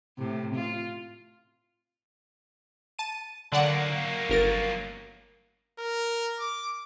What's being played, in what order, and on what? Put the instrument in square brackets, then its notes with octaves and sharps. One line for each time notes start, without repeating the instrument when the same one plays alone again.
[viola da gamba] A2 C3
F4
[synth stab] A5 D#7
[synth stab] D3 D5 F#5 [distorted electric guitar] F#3 A#3
[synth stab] G1 A#4 A6
[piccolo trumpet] A#4
D6